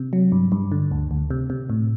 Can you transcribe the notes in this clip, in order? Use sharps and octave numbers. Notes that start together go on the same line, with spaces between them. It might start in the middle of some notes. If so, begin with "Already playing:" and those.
Already playing: C3
F#3
G2
G2
D3
D2
D2
C3
C3
A2